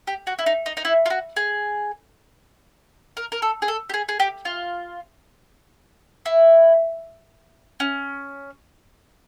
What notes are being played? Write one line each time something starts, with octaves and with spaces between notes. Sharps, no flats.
G4
F#4
E4
D#4
D#4
D#4
E4
F4
F#4
G#4
A#4
A#4
A4
G#4
A4
G4
G#4
G#4
G4
F4
E4
C#4